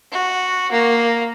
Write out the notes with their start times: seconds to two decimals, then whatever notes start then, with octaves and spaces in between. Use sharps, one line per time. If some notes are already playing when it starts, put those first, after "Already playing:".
0.12 F#4
0.71 A#3